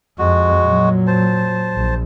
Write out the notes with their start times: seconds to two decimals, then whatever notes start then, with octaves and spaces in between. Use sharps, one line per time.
0.19 F2 G#3 F#4
0.64 A#2 F#3
1.07 C5 A5
1.75 A#1